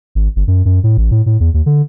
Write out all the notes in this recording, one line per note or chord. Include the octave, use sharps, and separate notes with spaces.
G#1
G1
F#2
F#2
A2
A1
A2
A2
E2
D#2
D3